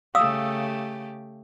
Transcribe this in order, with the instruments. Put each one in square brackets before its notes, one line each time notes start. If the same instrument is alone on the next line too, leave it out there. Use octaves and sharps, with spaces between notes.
[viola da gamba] C#3 A3 G4 [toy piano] F5 D#6 E6